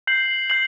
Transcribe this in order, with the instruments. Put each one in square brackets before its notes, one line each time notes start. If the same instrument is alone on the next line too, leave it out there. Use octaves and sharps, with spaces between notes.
[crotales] G6 C7 F#7
G6 C7 F#7